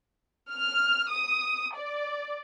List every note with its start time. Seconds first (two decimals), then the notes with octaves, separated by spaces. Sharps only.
0.52 F6
1.10 D#6
1.77 D5